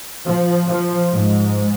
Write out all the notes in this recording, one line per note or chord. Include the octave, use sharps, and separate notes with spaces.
F3
F3
G#2